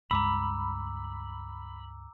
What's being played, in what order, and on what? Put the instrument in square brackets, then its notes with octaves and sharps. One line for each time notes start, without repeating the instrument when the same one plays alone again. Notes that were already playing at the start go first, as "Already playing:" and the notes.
[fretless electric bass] C#2 G2 G#3 [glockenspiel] A#5 D6 E6 [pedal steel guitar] B5